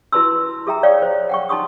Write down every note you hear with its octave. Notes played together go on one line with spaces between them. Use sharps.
E4 F#4 B4 A5 C6 E6
G#4 A4 E5 G5 A#5
C#5 D5 F5 G5
C5
F#5 G5 C#6
D#4 A5 C6 C#6 D#6